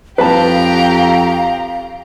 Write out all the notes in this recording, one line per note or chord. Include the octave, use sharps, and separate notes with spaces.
F2 G4 B4 F5 A5 A#5